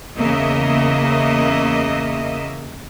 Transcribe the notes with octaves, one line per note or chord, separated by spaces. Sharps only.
E2 C#3 A#3 D#5 E5